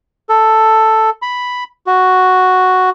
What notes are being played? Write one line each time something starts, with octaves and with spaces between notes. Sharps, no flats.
A4
B5
F#4